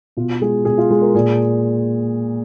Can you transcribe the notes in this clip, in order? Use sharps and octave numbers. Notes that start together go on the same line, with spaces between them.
B2 F4
G#3 G#4
B2 G#4
F4
G#3
A#4
A#2 G#4